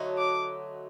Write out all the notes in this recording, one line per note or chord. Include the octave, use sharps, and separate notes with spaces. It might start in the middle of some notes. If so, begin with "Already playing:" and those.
Already playing: D3 F#3 A3 D#4
D6